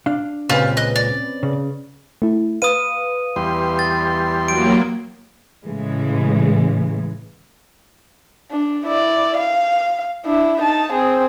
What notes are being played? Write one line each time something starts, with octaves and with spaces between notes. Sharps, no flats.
D4 F5
C#2 A#2 C#3 C4 C#4 F4 G4 B4
D#5 F#6
D5
C#3
A3 E4
B4 F5 D#6 D#7
E2 G3 C6
A6
F#3 A#3 D7
A2 C#3 E3 G#3
D4
E4 D5
F5
D4 E4
D#4 A5
C4 G#4